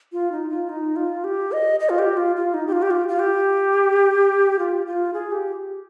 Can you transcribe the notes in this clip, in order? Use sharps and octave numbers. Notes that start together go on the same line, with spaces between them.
F4
D#4
F4
D#4
F4
G4
D#5
D#5
F4
G4
F4
F4
D#4
G4
F4
G4
F4
F4
G4
F4
F4
G#4
G4